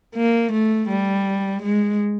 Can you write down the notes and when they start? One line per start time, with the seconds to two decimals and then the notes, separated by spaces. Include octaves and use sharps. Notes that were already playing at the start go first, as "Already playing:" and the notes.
0.15 A#3
0.52 A3
0.89 G3
1.63 G#3